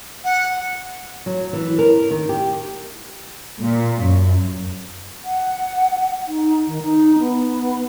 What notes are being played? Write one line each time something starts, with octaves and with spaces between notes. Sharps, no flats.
F#5
F#3
E3
A#4
D#3
G4
A#2
F#2
F#5
D#4
D#3
D#4
B3